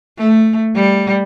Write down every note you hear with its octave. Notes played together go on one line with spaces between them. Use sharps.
A3
G3